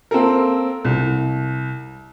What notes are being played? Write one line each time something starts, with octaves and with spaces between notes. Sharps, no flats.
A#3 C4 A4 A#4
C2